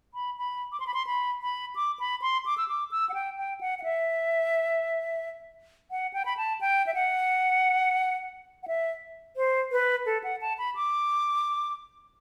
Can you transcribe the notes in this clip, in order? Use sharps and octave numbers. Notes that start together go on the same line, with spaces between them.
B5
B5
D6
C6
B5
C6
B5
B5
D6
B5
C6
D6
E6
D6
E6
F#5
G5
G5
F#5
F#5
E5
F#5
G5
B5
A5
G5
E5
F#5
F#5
E5
C5
B4
A4
F#5
A5
B5
D6